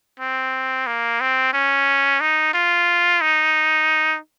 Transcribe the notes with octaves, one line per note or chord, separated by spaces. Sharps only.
C4
A#3
C4
C#4
D#4
F4
D#4